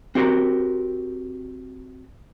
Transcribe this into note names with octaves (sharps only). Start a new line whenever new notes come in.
C4 F#4 G4 A#4 A#5